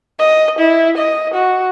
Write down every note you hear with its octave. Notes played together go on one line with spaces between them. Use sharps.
D#5
E4
D#5
F#4